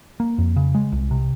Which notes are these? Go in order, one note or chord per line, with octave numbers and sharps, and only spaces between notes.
A#3
F2
C#3
G#3
C2
C3